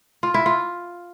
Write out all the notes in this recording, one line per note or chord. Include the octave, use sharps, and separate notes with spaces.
F4
E4
F4